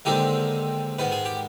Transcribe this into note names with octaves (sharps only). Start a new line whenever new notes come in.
D#2 D3 G#3 C4 D#4 G4
G#2 D#3 B3 B4
G#4
G4